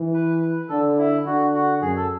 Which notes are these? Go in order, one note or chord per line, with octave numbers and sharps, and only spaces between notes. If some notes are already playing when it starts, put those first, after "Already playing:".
Already playing: E3
B4
B4
D3 A4
E4
D3 F#4
F#4
F#2 G#4
A4